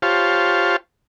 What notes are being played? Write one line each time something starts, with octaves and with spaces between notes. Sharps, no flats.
F4 G4 C5 C#5 F5 A5